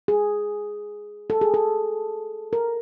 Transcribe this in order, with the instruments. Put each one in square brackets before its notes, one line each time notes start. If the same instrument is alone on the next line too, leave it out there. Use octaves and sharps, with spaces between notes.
[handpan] G#4
A4
G#4
A4
A#4